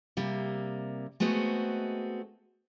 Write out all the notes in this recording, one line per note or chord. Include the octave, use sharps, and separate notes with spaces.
C3 G3 A#3
G#3 A3 B3 C4 F#4 D#5